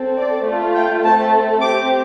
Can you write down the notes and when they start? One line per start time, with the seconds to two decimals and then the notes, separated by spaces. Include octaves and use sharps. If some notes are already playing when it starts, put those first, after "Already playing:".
Already playing: C4 A4
0.18 D5
0.46 A3 F4 A4
0.75 G5
1.04 A3 C4 A4 A5
1.61 C4 G4 D6